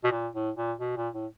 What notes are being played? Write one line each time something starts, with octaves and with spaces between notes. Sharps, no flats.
B2
A#2
A2
A#2
B2
A#2
A2